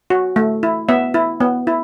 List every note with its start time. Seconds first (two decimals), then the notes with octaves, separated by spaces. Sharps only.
0.10 F#4
0.36 A3
0.63 E4
0.89 B3 E5
1.14 E4
1.41 B3
1.67 E4